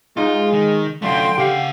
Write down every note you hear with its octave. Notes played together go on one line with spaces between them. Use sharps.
G#2 G#3 D#4 F4 D#5
D#3
F#2 D3 A3 F4 G5 C6
C#3 G4 F5 F#5